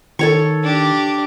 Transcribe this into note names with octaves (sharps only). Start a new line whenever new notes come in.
D#3 A4 C#5 C#6
D4 G4